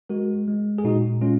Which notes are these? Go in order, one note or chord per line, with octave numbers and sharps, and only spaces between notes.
G#3 F#4 A#4
G#3
G#4
A#2 D#4 F#4
G#3 C#4 F4